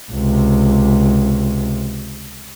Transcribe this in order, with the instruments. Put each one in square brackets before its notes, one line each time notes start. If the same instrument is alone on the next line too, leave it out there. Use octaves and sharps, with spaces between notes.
[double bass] C#2 C3